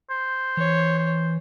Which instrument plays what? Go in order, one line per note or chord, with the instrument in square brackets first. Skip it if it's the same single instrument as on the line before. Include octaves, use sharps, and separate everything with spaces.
[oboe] C5
[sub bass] E3 [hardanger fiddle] C#5
[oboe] C5